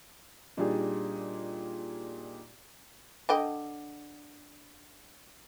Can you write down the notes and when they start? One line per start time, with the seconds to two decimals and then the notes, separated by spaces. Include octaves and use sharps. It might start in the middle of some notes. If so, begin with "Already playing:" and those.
0.57 A#2 G3 D4 D#4 G4 G#4
3.29 D3 D#5 G5